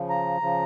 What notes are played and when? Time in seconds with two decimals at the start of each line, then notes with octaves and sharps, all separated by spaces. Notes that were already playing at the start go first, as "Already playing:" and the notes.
Already playing: C#3 F3
0.09 A#5
0.41 C#3 F3